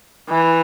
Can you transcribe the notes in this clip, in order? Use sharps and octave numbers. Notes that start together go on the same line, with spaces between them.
E3